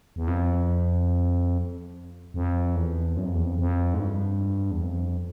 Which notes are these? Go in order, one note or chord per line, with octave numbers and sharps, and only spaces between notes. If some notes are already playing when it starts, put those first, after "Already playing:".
E2
F2
F2
E2
F#2
F2
E2
F2
F2
G#2
G2
E2
F2